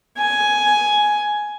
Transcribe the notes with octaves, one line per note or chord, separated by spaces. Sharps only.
G#5